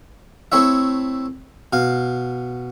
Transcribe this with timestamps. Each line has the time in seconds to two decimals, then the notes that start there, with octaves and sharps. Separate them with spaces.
0.52 A3 C4 E4 C#5 E5
1.73 B2 F5